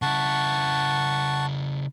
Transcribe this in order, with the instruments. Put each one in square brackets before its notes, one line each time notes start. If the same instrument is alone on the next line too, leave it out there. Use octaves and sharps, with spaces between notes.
[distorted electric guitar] C#3 E4 [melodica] F#5 A5 C#6